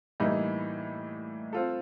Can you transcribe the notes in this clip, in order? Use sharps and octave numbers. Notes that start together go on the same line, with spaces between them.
A2 E3 G3 A#3 D#4
C4 F4 A4